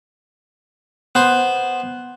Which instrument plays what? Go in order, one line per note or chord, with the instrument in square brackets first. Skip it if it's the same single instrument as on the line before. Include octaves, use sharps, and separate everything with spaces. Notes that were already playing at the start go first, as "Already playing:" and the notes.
[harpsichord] B3 C5